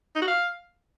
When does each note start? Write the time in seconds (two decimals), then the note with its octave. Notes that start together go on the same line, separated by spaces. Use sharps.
0.16 D#4
0.21 F#4
0.27 F5